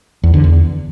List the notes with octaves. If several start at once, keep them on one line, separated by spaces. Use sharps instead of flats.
E2
D3
E2